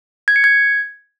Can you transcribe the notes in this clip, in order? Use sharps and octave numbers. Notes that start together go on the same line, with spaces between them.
G#6
C#7
G#6